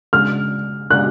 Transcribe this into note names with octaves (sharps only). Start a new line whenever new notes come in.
C#3 G#3 D4 F6
C#3 G#3 D4 F#6